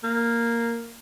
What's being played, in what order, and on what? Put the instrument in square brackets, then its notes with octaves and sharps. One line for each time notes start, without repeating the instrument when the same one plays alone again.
[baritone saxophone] A#3